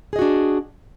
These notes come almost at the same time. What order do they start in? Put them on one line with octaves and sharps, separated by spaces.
G#4 D#5 F#4 D4